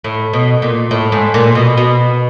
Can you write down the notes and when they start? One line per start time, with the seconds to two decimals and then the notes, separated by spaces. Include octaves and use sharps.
0.04 A2
0.33 B2
0.62 A#2
0.91 A2
1.12 G#2
1.34 A#2
1.55 B2
1.77 B2